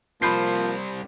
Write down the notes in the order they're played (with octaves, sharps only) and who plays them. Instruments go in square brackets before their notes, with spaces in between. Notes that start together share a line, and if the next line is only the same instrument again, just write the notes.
[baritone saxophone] F3 [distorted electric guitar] G3 C4 [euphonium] A#3 [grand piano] B5 G6 C7